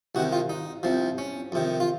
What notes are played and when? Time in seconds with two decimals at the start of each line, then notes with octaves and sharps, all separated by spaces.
0.15 C2 C3 D#3 F#4
0.32 F4
0.49 D#4
0.83 C2 C3 F3
1.18 C#4
1.52 F2 C3 D#3
1.80 F4